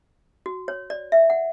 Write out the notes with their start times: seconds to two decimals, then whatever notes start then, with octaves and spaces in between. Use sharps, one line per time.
0.46 F#4
0.68 C#5
0.90 D5
1.12 E5
1.30 F#5